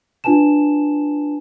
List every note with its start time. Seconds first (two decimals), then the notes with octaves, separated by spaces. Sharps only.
0.24 D4 F4 B4 G#5 A5 E7